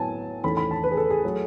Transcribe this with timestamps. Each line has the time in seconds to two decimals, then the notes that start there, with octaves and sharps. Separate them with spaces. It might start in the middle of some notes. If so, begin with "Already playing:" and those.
Already playing: A2 F#3 B3 G#5 A5
0.43 E2 D#3 A3 C#4 B5
0.57 B5
0.71 A5
0.84 B4
0.91 G#4
0.97 A4
1.10 G#4
1.25 F#3 A3